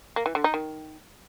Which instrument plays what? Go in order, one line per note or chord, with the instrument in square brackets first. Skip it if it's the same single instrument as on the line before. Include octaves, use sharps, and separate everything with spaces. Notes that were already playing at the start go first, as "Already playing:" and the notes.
[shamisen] A#3
E3
D3
D#4
D#3